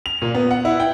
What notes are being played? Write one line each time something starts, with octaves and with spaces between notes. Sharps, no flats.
F7
A#2
B3
F#5
E4
G5